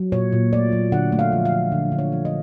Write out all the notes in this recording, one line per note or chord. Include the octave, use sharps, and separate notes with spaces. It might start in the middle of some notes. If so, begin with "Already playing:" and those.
Already playing: F#3
A#2 C#5
A#2
A3 D5
F#3
D3 F#5
A3
F5
F3
F5
F3
D3
D3
C#5
F3
D#5